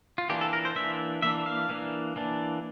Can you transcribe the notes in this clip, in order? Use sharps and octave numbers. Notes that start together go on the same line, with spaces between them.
F4
E3 A#3 D4 G4
A4
A#4
C5
E3 A#3 D4 E5
E3 A#3 D4 E5
F5
E3 A#3 D4
E3 A#3 D4